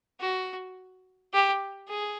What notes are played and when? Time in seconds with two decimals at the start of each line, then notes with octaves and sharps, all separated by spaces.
0.20 F#4
1.33 G4
1.89 G#4